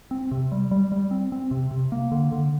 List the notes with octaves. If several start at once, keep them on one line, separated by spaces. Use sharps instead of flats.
C4
C3
G3
G3
G3
C4
C4
C3
C3
A#3
D3
D3